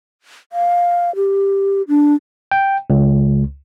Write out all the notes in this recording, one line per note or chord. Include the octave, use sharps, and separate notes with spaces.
F5
G4
D4
G5
C#2